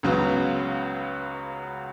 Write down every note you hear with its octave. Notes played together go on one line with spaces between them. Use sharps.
C#2 C#3 F#3 B3